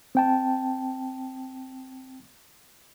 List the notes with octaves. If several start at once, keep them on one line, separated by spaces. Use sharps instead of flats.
C4 G5 A5